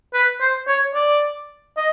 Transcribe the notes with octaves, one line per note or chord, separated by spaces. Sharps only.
B4
C5
C#5
D5
D#5